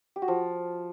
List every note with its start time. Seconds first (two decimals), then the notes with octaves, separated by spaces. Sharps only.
0.16 G4
0.22 F#4
0.28 F3